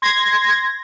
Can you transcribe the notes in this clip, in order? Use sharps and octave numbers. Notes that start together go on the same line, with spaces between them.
C6 G#6 A#6